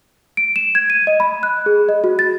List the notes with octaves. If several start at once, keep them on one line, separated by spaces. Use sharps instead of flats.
D7
E7
G#6
D#7
D#5
B5
F#6
G#4
D#5
F#4
A6